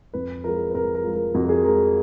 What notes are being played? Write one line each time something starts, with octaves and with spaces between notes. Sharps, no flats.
F2 B4
F3 G#3 A#4
B4
F2 A#4
A#4
F3 G#3
A#4
F2 F#4
A#4
G#4
F3 G#3 A#4